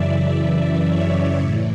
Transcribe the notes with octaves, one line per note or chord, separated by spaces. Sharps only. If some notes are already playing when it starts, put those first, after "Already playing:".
Already playing: F#2 C#3 E3 D5 E5
D5
C#5
A2 E3